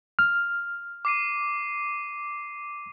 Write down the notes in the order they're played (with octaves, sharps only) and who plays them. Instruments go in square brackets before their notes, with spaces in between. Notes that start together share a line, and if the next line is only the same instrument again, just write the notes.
[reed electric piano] F6
[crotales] D6 C7 D#7